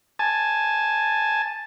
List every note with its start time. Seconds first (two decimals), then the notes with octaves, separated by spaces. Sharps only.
0.19 G#5 A5